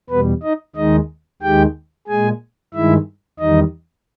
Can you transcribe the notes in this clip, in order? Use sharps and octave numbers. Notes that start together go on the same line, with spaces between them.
E2 B2 G3 B3 B4
D#4 D#5
D#2 D#3 G#3 D#4 D#5
D#2 D#3 G#3 G4 G5
A#2 G#3 G#4 G#5
G2 D#3 G#3 E4 E5
E2 D#3 G3 D#4 D#5